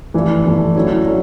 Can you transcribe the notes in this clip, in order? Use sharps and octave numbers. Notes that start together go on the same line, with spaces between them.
G2 E3 A3
G2 E3 A3
D3 F#3 C#4 E4
D3 F#3